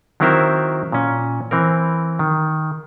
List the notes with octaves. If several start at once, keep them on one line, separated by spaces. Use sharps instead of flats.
D#3 F#3 C4 E4 A#4 C5
A#2 C#4
E3 C4 A#4
D#3